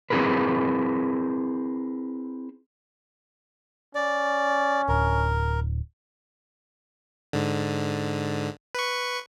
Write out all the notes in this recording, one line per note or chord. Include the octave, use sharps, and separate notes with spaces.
C4 E4 G#4 A#4 B4
C#4 D5
D1 A#4
G#2 D3
B4 C#6